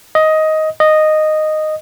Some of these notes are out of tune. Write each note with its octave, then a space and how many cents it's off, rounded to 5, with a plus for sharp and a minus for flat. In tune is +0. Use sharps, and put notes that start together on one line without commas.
D#5 +10
D#5 -10